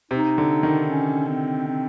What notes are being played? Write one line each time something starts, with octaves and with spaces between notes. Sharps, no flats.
C3 D#4
D3
D#3
C#4
C4
C4